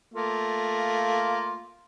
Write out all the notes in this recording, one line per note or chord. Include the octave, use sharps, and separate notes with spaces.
A3 A#3 F4